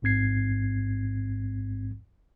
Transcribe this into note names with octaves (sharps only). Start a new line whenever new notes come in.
A1 G#2 C4 G#6 C7